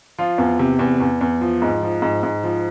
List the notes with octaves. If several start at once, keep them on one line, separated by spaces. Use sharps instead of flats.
F3 F4
E2
C3
E2
E2
E2
F3
G#2
F3
G#2
G#2
F3